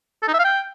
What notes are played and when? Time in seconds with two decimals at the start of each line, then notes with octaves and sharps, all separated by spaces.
0.23 A4
0.28 D#4
0.34 E5
0.39 F5
0.45 G5